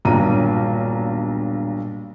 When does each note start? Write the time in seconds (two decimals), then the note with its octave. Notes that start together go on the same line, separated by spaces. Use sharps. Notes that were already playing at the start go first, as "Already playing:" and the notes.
0.05 D#1 B1 G2 A#5 D#7